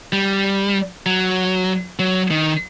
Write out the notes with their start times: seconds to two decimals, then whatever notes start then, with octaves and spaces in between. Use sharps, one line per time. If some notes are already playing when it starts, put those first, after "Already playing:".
0.13 G3
1.06 F#3
1.99 F#3
2.31 D#3